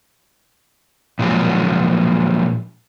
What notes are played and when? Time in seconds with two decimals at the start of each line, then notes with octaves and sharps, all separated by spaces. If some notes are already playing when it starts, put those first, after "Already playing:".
1.19 A#2 F3 F#3 G#3